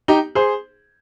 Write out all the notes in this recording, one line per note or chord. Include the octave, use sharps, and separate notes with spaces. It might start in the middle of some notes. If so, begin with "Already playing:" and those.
D#4 G4
G#4 C5